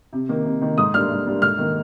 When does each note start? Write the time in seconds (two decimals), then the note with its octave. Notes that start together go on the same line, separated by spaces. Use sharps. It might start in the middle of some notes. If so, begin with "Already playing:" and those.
0.13 C3
0.29 D#3 A#3
0.45 C3
0.61 D#3 A#3
0.78 G#2 D#6
0.94 G3 A#3 D4 F6
1.10 G#2
1.26 G3 A#3 D4
1.42 G#2 F6
1.58 D#3 A#3